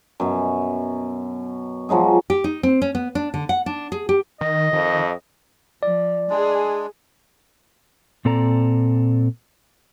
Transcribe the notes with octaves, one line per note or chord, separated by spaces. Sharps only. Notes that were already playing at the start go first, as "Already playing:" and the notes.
F#2 B2
F3 F#3 G#3 G#4
G4
D#4
C4
C#4
B3
D4
D3
F#5
D4
G#4
G4
D#3 D#5
F2 D#3
F3 D5
G#3 D4 G#4
A#2 C4 A4 D5 A#5